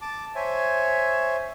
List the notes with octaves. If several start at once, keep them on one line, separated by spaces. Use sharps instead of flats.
A5 D6
C5 C#5 E5 G#5